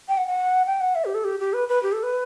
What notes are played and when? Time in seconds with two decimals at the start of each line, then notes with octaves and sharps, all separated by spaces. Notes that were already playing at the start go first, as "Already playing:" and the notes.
0.08 G5
0.17 F#5
0.27 F#5
0.66 G5
0.81 F#5
0.95 E5
1.05 G4
1.14 A4
1.24 G4
1.40 G4
1.53 B4
1.69 B4
1.83 G4
1.93 A4
2.03 B4